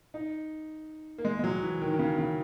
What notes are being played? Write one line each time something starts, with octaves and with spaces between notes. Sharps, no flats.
D#4
A#3
G#3
G#3
F#3
E3
D#3
D#3
C#3
C#3